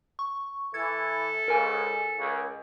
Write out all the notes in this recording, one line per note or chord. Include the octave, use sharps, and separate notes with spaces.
C#6
E3 A4 G#6
C#2 G#2 A#4 G#5
C#2